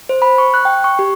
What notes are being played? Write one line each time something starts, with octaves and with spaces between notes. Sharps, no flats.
C5
B5
C#6
F#6
G5
C#6
G4